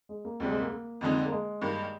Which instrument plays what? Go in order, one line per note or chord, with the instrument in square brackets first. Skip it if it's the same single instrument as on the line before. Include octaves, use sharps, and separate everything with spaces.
[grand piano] G#3
A#3
[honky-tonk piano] D2 C3 G3 [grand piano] G#3
[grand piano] G#3
A#3
A#3
[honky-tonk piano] F2 D3 G#3 D#4
[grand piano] A#3
G#3
[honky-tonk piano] G2 D#3 A#3